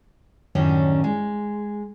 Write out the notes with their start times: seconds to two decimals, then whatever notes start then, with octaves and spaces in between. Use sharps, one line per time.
0.55 F#2 A2 D#3 G3 C#4 D4
1.04 G#3